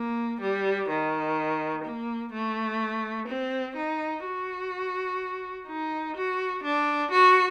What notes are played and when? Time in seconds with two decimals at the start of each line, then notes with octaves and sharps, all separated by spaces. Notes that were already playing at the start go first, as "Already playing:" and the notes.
Already playing: A#3
0.41 G3
0.89 D#3
1.84 A#3
2.33 A3
3.28 C4
3.77 D#4
4.25 F#4
5.67 D#4
6.16 F#4
6.64 D4
7.11 F#4